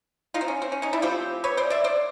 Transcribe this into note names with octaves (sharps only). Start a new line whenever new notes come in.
D#4 F4
C4
C#4
C4
C#4
C#4 D#4
D4 E4
F3 A3 C4 F4 G4
B4 C#5
C5 D5
D5 E5
C5 D5